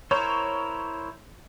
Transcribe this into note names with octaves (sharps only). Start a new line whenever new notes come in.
E4 A#4 C5 C#5